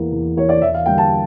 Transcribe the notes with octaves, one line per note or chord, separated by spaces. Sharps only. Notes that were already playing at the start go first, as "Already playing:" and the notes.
Already playing: E2 E3 A#3
E2
E3 A#3 C#5
D5
E2 E5
F5
D3 G3 A#3 G5
A5